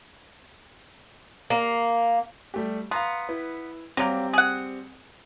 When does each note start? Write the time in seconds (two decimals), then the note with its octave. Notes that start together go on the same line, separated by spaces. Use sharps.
1.50 A#3
2.54 G3 A3 G4
2.91 B3 F5 A#5 C6
3.29 E4 B4
3.97 F#3 G3 A#3 C4 G4
4.33 G#4 F#5